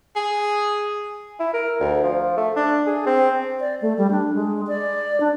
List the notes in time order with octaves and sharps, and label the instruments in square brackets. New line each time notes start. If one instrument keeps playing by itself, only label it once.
[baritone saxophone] G#4
[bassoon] E4
A#4
D2
F3
A3
D4
G#4
C4
[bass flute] D5
A3
G3
D4
G#3
D5
D4